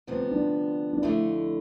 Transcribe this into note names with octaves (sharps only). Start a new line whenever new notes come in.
D2 C3 F3 B3 C4
D4
D4
F2 D3 A3 E4